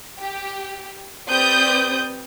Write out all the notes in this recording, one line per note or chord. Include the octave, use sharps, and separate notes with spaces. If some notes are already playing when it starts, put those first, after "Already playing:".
G4
C4 G4 B4 D5 D#6 G6